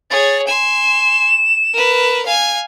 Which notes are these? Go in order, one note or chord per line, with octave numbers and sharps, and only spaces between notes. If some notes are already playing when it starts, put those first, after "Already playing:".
G#4 C#5 A6
G#5 C6 E7
A#4 B4
F5 G#5